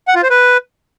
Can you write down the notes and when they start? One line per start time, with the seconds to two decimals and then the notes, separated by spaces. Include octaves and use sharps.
0.08 F#5
0.15 F4
0.23 C5
0.30 B4